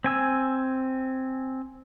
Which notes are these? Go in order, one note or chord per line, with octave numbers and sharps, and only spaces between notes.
C4 G#5 E6